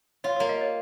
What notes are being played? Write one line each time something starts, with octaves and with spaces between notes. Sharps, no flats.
F4 C#5
C#5
A#3
D#5
C#5